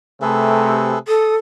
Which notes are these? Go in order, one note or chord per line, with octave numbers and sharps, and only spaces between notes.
C3 A3 G#4 A4 B4
A4 D#6